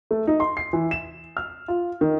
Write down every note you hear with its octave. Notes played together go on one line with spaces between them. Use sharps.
A3
D#4
C6
C7
E3
E7
F6
F4
D#3